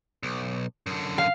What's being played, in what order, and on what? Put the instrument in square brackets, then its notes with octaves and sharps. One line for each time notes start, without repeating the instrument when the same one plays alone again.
[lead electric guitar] B1
F#2 D3
[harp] F5